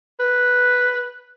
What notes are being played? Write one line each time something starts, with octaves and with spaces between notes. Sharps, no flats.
B4